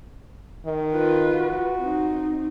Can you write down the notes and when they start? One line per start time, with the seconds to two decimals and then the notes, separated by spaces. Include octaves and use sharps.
0.65 D#3
0.94 F4 B4
1.35 F#4
1.79 C4 D#4